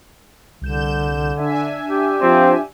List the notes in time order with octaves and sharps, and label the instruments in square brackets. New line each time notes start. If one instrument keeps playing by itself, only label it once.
[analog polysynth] C2 G6 E7 [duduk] D3
[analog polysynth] D4 E5 G#5
[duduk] G4
[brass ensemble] F3 C4